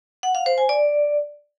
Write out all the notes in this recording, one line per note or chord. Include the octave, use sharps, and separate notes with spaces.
F#5
F5
C5
G#5
D5